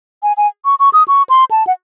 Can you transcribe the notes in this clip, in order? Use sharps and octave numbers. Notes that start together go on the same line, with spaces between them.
G#5
G#5
C#6
C#6
D#6
C#6
C6
A5
F#5